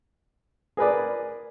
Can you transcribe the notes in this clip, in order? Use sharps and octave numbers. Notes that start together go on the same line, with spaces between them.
G#4 A#4 B4 D5